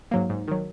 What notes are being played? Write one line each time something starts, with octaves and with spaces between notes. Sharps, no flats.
G#2 F#3 A#3
G#2
D#3 F#3